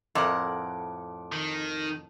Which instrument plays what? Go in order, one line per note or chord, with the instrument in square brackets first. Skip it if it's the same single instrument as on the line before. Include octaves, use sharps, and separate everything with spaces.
[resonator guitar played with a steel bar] F2 [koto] A2 A#4 F#5 [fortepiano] D6
[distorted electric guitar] D#3